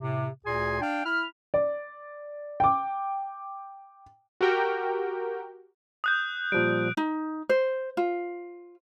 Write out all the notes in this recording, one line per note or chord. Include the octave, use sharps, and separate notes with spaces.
A2 C3
D2 A#2 G#4 G#5 C6
D4 F5 G5
E4 B5 F6
D5
G5 D6
F#4 G4 A#4 G5
D#6 F#6 G6
A#2 F3 G3 D7
D#4
C5
F4